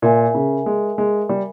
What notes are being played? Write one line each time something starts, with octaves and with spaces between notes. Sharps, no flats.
A#2 A#4 E5 G#5
C#3
G#3
G#3
G3